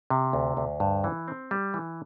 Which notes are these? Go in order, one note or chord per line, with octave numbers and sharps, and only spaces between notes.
C3
D2
D2
G2
E3
C4
G3
E3